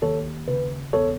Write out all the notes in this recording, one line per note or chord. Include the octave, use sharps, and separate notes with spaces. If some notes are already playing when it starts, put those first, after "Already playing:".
D#2 A4 C#5
C#3 B4
E1 A4 C#5